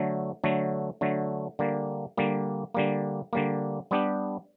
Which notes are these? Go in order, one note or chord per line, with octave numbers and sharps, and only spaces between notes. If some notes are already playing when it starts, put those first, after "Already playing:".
Already playing: D3 F#3 A3
D3 F#3 A3
D3 F#3 A3
D3 G3 A#3
D3 G3 A#3
D3 G3 A#3
D3 G3 A#3
G3 B3 D4 G4